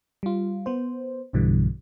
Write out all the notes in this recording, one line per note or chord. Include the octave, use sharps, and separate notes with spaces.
G3 F4
B3 C5
B1 G2 B2 D3 E3 G3